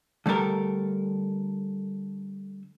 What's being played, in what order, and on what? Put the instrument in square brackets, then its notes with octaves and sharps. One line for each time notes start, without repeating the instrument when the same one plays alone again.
[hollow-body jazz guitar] D3 G3 A3 A4 A#4